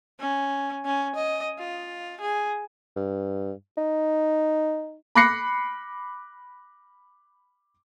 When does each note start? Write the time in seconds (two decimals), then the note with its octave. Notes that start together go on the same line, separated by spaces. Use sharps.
0.20 C#4
0.86 C#4
1.16 D#5
1.59 F4
2.21 G#4
2.96 G2
3.78 D#4
5.15 B5 D6 F#6 A#6 C7 C#7